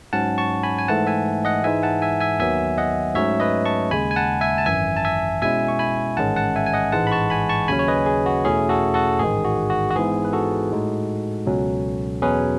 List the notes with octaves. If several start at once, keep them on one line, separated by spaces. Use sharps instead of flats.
G#2 F#3 C#4 F#5 A5
A5 C#6
G#5 B5
G#5
G#2 E3 A3 F#5 A5
E5 G#5
D#5 F#5
G#2 E3 G#3 D#4 E5 G#5
F#5 A5
E5 G#5
E5 G#5
D#2 D#3 F#3 B3 E5 G#5
D#5 F#5
G#2 F#3 A3 C#4 C#5 E5
B4 D#5
A5 C#6
D#2 C#3 G#3 G#5 B5
G#5
F#5 A5
E5 G#5
A5
G#1 F#2 E3 E5 G#5
A5
E5 G#5
B2 G#3 C#4 E4 E5 G#5
C#6
G#5 B5
A1 G#2 D#3 G#3 C#4 F#5 A5
F#5 A5
E5 G#5
G#5
D#5 F#5
A1 G#2 E3 G#3 F#5 A5
B5
A5 C#6
G#5 B5
A5 C#6
D#2 C#3 F#3 C#4 G#5 B5
C#5
B4 D#5
G#4
F#4
E2 B2 A3 C#4 E4 G#4
F#4 A4
F#4 A4
A1 G#2 D#3 G#3 G#4
F#4
F#4
F#4
G#2 E3 B3 E4 G#4
B4
F#4 A4
A2 G#3 D#4
C#2 B2 F#3 C#4
E2 B2 F#3 C#4 G#4 B4